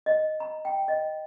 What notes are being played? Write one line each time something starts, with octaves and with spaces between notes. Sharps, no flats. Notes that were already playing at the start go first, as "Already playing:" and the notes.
D#5
A#5
G5
D#5